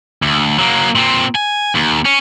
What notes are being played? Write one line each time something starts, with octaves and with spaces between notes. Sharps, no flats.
D2
F#3 A#3
A#2 C4
G#5
D#2
C#4